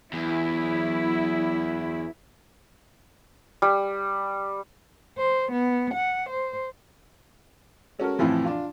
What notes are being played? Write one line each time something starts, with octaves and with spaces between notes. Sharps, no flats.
E2 F#3 E4
G3
C5
B3
F#5
C5
G#3 C#4 F#4 A4 A#4
F2 A2 C3 E3 F3
D4 F4